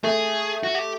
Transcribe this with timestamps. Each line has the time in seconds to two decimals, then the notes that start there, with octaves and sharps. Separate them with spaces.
0.04 A3 G#4
0.63 F#4
0.75 G4